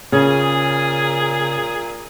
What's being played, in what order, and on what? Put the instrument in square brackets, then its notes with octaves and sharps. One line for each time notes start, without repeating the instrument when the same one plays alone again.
[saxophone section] A#2 G#4 [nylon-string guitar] C#3